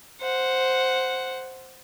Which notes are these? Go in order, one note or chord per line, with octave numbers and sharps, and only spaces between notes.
C5 F#5